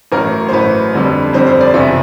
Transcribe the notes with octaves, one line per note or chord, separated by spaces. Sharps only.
A1 A2 F#3 A#4
C5
A1 A2 F#3 B4
F2 D3 G3
F2 D3 G3 C5
C5
D5
F#1 E2 C3 F3 E5